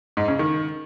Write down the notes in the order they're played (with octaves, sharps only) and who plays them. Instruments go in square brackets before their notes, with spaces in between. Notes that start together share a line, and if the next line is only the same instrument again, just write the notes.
[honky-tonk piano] G#2
C#3
D#3